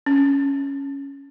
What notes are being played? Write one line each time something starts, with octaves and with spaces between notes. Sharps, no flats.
C#4